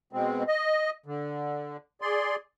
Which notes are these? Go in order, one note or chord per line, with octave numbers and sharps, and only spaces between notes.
B2 G#3 C4
D#5
D3
G#4 D5 C6